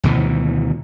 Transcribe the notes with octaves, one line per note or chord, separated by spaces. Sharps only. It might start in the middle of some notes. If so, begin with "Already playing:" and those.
D2 B2 D#3 E3